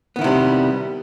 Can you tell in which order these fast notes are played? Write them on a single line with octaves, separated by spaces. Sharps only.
B3 D#3 E4 C3 G3